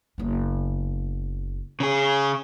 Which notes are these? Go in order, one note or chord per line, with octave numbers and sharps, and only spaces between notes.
F#1 B3
C#3 G#4